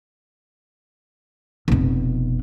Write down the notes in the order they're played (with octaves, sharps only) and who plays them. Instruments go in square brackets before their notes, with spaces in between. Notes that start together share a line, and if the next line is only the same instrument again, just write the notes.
[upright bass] F1 B2